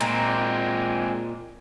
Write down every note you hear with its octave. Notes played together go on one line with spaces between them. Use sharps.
A#2 G#3 C4